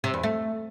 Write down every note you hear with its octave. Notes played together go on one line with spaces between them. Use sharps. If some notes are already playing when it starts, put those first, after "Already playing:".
C3
E2
A3